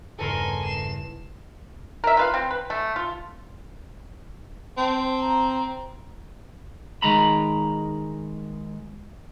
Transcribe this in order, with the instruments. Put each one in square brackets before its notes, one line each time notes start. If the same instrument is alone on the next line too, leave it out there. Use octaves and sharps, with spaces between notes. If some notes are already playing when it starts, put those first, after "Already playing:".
[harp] E2 G2 C#3 [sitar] A4 A#4 [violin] G#5 C6
[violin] C7 E7
[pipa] A#4 E5
F4 B4 F5
C4
B4
A3
F4
[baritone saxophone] C4 [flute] A5
[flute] A#5
[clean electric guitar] D#3 G#3 A#5 B5